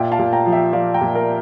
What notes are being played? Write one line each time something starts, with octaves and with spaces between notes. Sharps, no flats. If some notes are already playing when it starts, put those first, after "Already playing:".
Already playing: A#2 E5 G5
F5 A5
A#2
G5 A#5
F3
E5 G5
F3 D5 F5
G5 A#5
A#2
A#4 D5